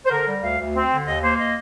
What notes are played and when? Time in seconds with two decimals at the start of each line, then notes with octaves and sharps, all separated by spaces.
0.06 C5
0.11 D3 A#4
0.26 G3
0.42 D2 F5
0.59 D2
0.74 C4
0.90 D3
1.05 D#2 D#5
1.22 A#3 C5
1.38 D#5